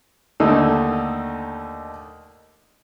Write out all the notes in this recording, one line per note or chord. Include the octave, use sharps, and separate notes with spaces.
D#2 D3 A3 D#4 E6